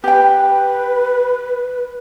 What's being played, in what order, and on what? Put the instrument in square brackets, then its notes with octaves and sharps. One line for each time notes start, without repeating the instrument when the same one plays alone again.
[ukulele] G4 G5 [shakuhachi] B4